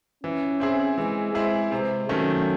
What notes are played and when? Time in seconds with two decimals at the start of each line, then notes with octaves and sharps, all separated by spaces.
0.24 E3 C#4
0.60 C4 E4 G#4
0.98 E3 G#3
1.35 G#3 C4 E4 G#4
1.72 C3 G#3
2.09 D#3 F#3 A3 C#4